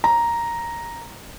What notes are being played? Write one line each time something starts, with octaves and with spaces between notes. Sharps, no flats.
A#5